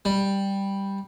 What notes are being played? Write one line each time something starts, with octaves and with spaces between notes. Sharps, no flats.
G3